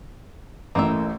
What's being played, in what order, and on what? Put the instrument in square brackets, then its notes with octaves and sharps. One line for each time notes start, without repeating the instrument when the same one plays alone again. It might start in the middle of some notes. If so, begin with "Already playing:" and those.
[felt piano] A1 A2 [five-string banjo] A#3 D#4 E5